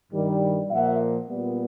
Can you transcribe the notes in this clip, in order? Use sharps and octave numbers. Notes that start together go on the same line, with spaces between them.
G2 D#3 G3
A#2 F3 A#3 E5 F#5
A#2 G3 B3